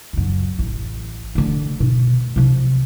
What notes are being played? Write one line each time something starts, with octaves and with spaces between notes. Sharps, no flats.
C#2 F#2
A1
D3 A3
B2 D#3
C3 F3